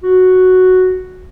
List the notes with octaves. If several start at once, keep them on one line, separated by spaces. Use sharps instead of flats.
F#4